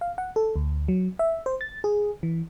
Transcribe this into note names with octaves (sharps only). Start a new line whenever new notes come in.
F5
F#5
A4
D2
F#3
E5
C5
A6
G#4
E3